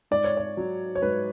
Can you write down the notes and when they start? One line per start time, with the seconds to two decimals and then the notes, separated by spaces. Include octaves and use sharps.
0.11 G#2 D5
0.24 C#5
0.37 D5
0.57 F#3
0.95 C#5
1.02 G#2 B4